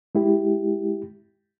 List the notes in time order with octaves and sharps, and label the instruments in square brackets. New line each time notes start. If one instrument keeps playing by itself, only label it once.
[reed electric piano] G#3 E4 G4